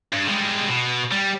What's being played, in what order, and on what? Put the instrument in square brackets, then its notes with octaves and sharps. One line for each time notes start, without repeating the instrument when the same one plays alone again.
[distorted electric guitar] G2
G3 G#3
B2
G3